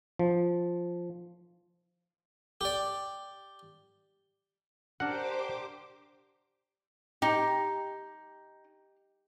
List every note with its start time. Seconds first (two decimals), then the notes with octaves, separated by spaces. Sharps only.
0.19 F3
2.61 G4 D5
5.00 D4 G4 A#4 C5 F#5 D6
7.22 D#4 G4